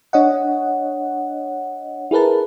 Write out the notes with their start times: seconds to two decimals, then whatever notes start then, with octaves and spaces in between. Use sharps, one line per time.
0.13 D4 C#5 D#5 F#5
2.11 E4 G#4 A#4 B4 A5